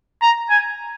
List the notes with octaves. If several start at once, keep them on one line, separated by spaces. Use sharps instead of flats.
A#5
G#5